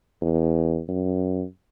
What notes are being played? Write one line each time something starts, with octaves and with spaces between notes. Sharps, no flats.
E2
F#2